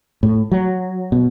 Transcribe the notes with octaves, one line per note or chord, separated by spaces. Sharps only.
A2
F#3
B2